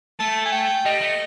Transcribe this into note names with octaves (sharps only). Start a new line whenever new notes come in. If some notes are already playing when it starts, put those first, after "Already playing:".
A3 A5
G#5
G5
G3 D#5
A3